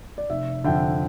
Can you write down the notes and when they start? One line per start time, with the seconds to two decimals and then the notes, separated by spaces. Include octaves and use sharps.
0.18 D5
0.30 F1 E5
0.64 F2 D3 E5 G5